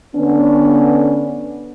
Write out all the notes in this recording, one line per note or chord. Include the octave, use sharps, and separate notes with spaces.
D3 B3 C#4 D4